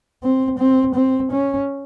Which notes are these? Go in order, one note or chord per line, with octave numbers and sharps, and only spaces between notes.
C4
C4
C4
C#4